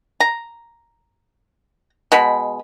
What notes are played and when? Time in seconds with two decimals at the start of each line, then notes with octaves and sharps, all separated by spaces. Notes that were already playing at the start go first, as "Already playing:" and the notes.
0.20 A#5
2.12 B2 G#3 B5